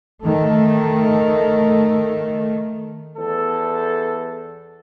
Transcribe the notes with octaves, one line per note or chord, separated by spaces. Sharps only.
D#3 A3
E2 A4